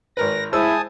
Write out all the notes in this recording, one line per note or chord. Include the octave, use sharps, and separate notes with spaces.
G#1 A#4 B4 A#6
G#3 E4 C5 G#5 A5 D#6 E6